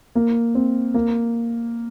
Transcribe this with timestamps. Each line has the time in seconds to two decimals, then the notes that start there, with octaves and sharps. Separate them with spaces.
0.15 A#3
0.55 C4
0.94 A#3